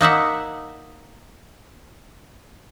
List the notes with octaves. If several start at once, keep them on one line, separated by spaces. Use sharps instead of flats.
A#3 D#4 E5 F#5